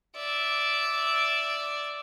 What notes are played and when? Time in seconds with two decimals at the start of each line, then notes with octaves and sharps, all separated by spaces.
0.16 D5 E5